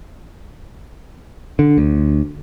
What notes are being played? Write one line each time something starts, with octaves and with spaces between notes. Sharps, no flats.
D3
D2